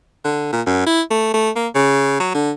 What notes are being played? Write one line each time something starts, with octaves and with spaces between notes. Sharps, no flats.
D3
A#2
F#2
E4
A3
A3
A#3
C#3
F#3
D3